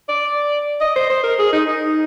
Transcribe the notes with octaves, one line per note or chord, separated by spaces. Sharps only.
D5
D#5
C5
C5
A#4
G#4
D#4
D#4